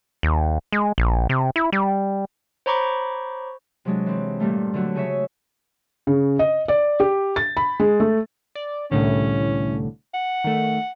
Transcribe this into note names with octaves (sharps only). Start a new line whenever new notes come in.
D#2
G#3
A#1
C3
E4
G3
C5 C#5 A#5 B5 C#6 D6
C3 F#3 G#3 D4
E3 C4
G2 A#2 G3 A3
D3 F#3 A3 F#4
C#3 G#4 C#5 E5
C#3
D#5
D5
G4
A6
B5
G#3
A3
D5
C2 A2 D3 C#4
F#5
D#3 A3